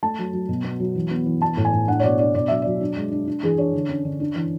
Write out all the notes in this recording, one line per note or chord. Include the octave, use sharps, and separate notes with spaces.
A3 A5
F#3
F#3
B2
B3
F#3
E3
B3
E3
B3 A5
A2
G#5
A2
D4 F#5
C#5
B2 D5
D4 D5
B2 D5
F#3 E5
F#3 D5
D4
G#3
D4
D4
E3 G#4
D4 C#5
D3
C#4
D3
D4
E3